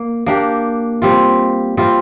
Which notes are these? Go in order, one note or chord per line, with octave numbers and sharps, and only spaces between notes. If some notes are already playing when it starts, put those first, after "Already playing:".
Already playing: A#3
A#3 D4 G4
G3 C4 F4
G3 C4 F4